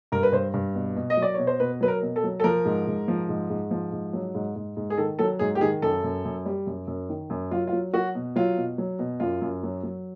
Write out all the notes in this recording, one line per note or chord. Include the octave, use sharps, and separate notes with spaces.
G2 A#4
B4
G2 C5
G2
B2
B2
D#5
F#3
D5
B2 C#5
C5
B2 B4
F#3 B4
A#4
B2
A4
F#3
A4
F3 A#4
G#2
G#2
F3
G#2
G#2
F3
G#2
F#3
G#2
G#2
G#2
G#4
D#3 A4
F#3 A4
G#2 G#4
G4
D#3 G#4
F#2 A4
F#2
F#2
G3
F#2
F#2
D#3
F#2
F#3 F4
F4
F#3
F#3 F#4
B2
F#3 F4
B2
F#3
B2
F#2 F4
F#2
F#3
F#3